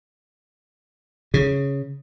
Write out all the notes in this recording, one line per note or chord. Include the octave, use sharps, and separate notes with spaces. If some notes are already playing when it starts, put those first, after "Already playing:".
C#3